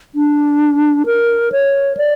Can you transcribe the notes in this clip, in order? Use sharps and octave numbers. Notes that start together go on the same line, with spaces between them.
D4
A#4
C#5
D5